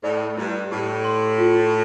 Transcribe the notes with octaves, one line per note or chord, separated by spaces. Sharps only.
A2 D5
G2 E4
A2 G4
C6
F4